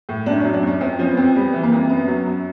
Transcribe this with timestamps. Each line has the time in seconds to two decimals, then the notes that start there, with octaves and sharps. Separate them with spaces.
0.09 A2
0.26 F#2 D4
0.40 C#4
0.45 F#3
0.54 D4
0.63 F#2 C#4
0.80 F2 C4
0.99 F3 C#4
1.09 B3
1.17 F2 C4
1.35 G3 B3
1.53 E3
1.63 A#3
1.72 F2
1.89 F#2 B3
2.08 F#3
2.27 F#2